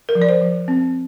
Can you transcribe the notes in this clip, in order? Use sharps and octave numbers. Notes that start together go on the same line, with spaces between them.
A#4
F3
D5
C5
F3
C4